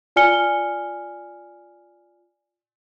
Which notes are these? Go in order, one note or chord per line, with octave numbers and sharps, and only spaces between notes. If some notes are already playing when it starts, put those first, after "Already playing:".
F4 D5 G#5 F6 C#7 G7